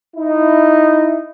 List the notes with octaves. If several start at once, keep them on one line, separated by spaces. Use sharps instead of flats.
D#4 E4